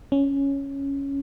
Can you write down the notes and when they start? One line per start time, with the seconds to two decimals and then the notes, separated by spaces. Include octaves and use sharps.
0.12 C#4